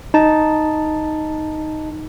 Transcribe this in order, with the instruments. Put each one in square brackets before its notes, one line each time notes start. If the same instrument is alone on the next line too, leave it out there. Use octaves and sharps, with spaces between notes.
[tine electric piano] D#4 A5